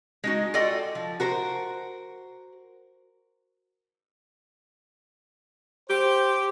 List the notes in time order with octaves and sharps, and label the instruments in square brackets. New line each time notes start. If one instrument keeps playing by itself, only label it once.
[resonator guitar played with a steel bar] G#3 D#4 F#4
F4 F#4 A4 D5 D#5 G5
F3
F#4 A#4 C5
[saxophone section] G4 [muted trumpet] C5